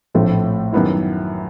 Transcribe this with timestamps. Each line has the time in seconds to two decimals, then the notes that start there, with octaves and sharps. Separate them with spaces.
0.14 A#1 A2 F3 A3 C4
0.73 F#2 D#3 G3 B3 E4